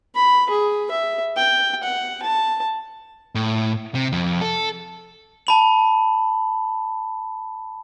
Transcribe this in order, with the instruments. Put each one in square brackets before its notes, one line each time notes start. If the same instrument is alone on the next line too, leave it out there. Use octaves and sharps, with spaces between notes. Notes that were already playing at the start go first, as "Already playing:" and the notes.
[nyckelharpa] B5
G#4
E5
G5
F#5
A5
[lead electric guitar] A2
C3
F2
A4
[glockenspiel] A5 B5 F#7